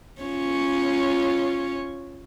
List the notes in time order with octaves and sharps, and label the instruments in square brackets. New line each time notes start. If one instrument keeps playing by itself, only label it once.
[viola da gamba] C#4 F4 C#5